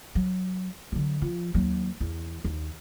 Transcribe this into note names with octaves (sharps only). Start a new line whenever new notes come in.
F#3
D3 F#3
F3
D#2 F#3
E2
D#2